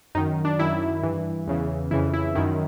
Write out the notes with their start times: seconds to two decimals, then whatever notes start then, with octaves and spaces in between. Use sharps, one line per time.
0.15 F#2 D#3 D#4
0.45 D4
0.59 F#2 D#3 E4
1.03 G2 E3
1.47 E2 C#3 E3
1.91 F2 C#3 E3 E4
2.14 E4
2.35 F#2 D#3 E4